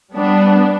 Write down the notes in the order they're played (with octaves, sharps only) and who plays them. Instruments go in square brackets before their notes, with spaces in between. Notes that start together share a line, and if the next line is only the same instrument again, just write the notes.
[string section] G3 B3 D4